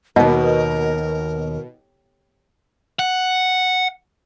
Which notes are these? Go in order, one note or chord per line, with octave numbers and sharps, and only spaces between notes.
D#2 G#2 B2 A#4
F#5